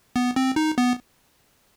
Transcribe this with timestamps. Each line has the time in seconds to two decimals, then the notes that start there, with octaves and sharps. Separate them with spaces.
0.16 B3
0.36 C4
0.56 D#4
0.78 B3